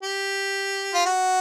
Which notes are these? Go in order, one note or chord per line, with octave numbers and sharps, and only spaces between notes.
G4
F4
F#4